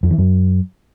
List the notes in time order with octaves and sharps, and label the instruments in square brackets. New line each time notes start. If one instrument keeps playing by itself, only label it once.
[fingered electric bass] F2
E3
F#2